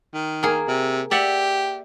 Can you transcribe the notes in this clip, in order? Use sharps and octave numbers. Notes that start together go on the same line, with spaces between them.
D#3
A#3 G#4
C3
G4 D5 E5 F#5